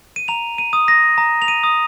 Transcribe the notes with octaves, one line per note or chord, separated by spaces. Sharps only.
D#7
A#5 F7
D#7
D#6
A#6
A#5
F7
D#7
D#6